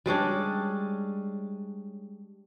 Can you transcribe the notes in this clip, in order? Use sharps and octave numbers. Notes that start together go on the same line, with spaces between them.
G3 G#3 C#4 D4